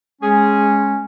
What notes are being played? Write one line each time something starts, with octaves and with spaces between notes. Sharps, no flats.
G#3 C#4 G#4